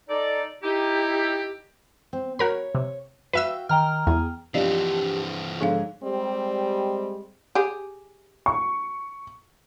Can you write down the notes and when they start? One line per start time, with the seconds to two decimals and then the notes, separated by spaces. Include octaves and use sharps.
0.09 D#4 A4 D5
0.63 D#4 E4 G4
2.13 C4
2.39 F#4 A#4 C#5 B5
2.75 C3
3.33 F#4 B4 E5 F5 G5 E6
3.69 D#3 G5 A#5 F6
4.07 E2 G#4
4.54 G2 E3 F3 C4 G4 D5 D#5 F5
5.61 G#2 D3 F3 G#4 A4 F5
6.03 G3 G#3 C4
7.55 G4 G#4
8.46 C#6